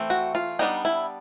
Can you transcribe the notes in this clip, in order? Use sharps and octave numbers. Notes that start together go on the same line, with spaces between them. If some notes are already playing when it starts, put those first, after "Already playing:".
Already playing: E3 A3 C4
F#4
F4
G3 B3 D4 D#4
E4